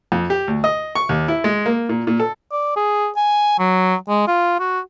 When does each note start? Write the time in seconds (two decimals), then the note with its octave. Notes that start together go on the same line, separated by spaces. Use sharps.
0.12 F2
0.30 G4
0.48 D2
0.64 D#5
0.95 C#6
1.09 D#2
1.28 E4
1.44 G#3
1.66 A#3
1.89 A#2
2.07 A#2
2.20 A4
2.52 D5
2.76 G#4
3.16 G#5
3.59 F#3
4.09 G#3
4.28 F4
4.60 F#4